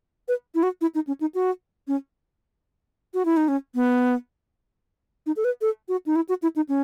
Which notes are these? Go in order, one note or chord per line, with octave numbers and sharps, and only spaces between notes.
B4
E4
F#4
E4
D#4
C#4
D#4
F#4
C#4
F#4
E4
D#4
C#4
B3
D#4
A4
B4
A4
F#4
D#4
E4
F#4
E4
D#4
C#4